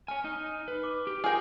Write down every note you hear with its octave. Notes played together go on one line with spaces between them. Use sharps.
C#5 G#5 F6
D#4
B4
D6
G4
F4 G#4 A#4 G5